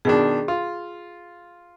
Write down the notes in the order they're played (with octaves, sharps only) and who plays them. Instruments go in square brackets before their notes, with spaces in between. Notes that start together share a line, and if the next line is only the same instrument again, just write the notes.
[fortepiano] B2 D#3 D4 [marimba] G#4
[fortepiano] F4